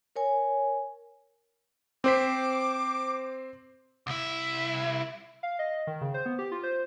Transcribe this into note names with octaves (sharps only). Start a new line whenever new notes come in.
A#4 C#5 G#5
C4 C5 D6 B6
C2 E4
F5
D#5
D#3
C#3
C5
B3
G4
F4
C5